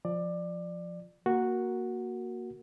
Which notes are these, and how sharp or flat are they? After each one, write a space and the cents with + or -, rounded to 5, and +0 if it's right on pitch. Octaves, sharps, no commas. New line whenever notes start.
F3 +0 D5 +20
A#3 +0 F#4 +0 A#4 +5